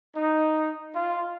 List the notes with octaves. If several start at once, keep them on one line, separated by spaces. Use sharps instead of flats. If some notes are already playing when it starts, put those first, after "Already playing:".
D#4
F4